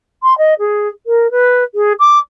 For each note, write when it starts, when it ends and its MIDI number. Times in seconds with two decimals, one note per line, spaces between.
0.23 0.37 84
0.38 0.54 75
0.60 0.89 68
1.07 1.31 70
1.31 1.64 71
1.75 1.93 68
2.00 2.19 86